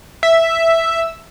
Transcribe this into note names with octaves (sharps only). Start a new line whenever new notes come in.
E5